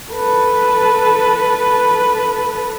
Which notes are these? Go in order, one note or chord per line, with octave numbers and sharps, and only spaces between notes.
A4 B4